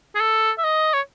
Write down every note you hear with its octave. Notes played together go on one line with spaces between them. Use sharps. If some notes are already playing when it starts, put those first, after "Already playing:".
G#4
A4
E5
D#5
C#5